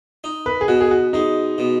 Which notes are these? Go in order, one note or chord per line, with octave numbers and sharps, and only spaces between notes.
D#4
B4
G#4
B2 F#4
G#4
F#4
G#3 D#4
B2